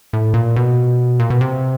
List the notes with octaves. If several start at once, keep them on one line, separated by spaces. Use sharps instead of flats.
A2
A#2
B2
A#2
B2
C3